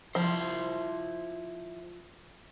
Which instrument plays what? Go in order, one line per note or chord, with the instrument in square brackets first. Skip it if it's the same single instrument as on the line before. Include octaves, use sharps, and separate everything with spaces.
[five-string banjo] F3 [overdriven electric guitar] E4 C5